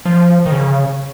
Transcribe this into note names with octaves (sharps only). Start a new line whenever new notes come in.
F3
D#3
C#3